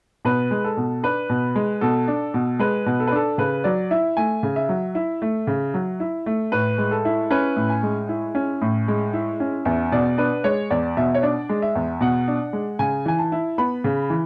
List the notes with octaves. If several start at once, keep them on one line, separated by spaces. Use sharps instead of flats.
B2 B4
G#3
A4
B2
D4 B4
B2
G#3
B2 A4
D4
B2
G#3 B4
B2
A4
B4
D4 A4
C#3 B4
F#3 D5
E4 E5
A3 G#5
C#3
E5
F#3
E4
A3
C#3
F#3
E4
A3
A2 B4
G#3
A4
E4
C#4 B4
A2
G#5
G#3
E4
C#4
A2
G#3
E4
C#4
E2 E5
B2 D5
D4 B4
G#3 C#5
E2 D5
B2 E5
C#5
D4 D5
G#3
E5
E2
B2 F#5
D4
G#3
C#3 G#5
E3 G#5
A5
E4
B3 B5
C#3
E3